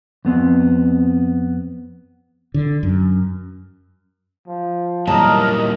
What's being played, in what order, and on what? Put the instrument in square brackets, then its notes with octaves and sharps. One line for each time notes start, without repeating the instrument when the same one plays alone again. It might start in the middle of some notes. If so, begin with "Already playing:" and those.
[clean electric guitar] F2 B3 C4
[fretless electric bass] D3
F#2
[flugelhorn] F3
[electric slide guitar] A#2 G3 E4 [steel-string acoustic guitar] F#3 A5 A#5 [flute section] A#4 [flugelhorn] D#5